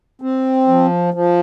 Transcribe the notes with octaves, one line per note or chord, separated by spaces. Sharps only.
C4
F3
F3